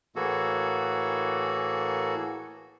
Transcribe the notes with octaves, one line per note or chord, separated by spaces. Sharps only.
A2 E3 A#3 F#4 G#4 A4